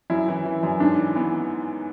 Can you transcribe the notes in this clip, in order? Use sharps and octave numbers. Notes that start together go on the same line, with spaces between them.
F#2 E4
E3
E3
F#2
G#2 D4
E3
E3 B3